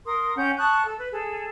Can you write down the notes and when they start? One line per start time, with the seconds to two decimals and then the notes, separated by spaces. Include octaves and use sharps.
0.06 A#4 C6 D#6
0.37 C#4 F#5 G5 G6
0.58 A5 C#6 D#6 F#6
0.83 A4
0.96 B4
1.12 G#4 A4